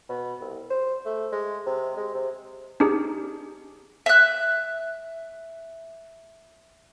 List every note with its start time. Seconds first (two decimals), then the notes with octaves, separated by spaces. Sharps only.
0.09 B2
0.41 C2
0.70 C5
1.05 A3
1.32 G#3
1.66 C3
1.97 G#3
2.14 C3
2.80 D4 D#4 G4 G#4
4.06 E5 F#6